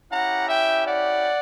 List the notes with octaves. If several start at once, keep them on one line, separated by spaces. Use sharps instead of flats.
C#4 E4 G4 F#5 A#5
E5 G5
D5 F#5